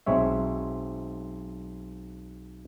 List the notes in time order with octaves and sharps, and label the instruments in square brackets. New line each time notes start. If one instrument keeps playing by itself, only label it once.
[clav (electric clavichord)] B1 G#3 C4 C#5 E5